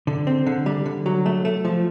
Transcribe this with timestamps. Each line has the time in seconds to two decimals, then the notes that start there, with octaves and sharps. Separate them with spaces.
0.07 D3
0.27 C4
0.46 D3
0.66 G3
0.86 D3
1.06 F#3
1.26 A3
1.45 A3
1.65 F3